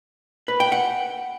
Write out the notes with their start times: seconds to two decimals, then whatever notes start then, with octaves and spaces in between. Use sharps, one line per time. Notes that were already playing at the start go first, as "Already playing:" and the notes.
0.48 B4
0.60 G5
0.72 F#5